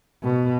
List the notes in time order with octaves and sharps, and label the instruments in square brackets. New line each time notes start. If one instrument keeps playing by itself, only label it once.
[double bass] B2